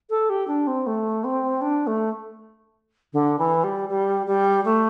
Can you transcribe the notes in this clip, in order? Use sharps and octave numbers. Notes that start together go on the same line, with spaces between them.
A4
G4
D4
C4
A3
C4
D4
A3
D3
E3
G3
G3
G3
A3